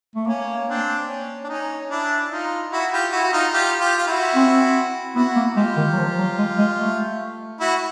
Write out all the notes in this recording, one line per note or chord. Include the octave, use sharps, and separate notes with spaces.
A3
A#3 C#4
C4 D4
C#4
D4
C#4 D#4
D4 E4
D#4 F4
E4 F#4
F4 G4
E4 F#4
F#4
D#4 F4
F4 G4
F4 G4
F4
E4 F#4
C4
B3 E4 F#4
A#3
G#3 F4 G4
D#3
F#3
F3
F#3
G#3
G#3
A3
E4 F#4